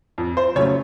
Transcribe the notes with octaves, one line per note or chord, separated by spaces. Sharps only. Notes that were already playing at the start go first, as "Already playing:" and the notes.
F2
C5
C#3 F#3 A3 C#5